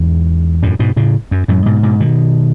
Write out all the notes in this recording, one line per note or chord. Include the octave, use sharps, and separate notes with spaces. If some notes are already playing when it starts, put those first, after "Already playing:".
Already playing: E2 G#2
F#2 A2
G#2 B2
A2 C#3
F#2
F#2 A2
G#2 B2
G#2 B2
B2 D#3